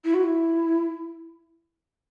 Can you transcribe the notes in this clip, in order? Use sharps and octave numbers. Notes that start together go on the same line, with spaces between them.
E4
F#4
E4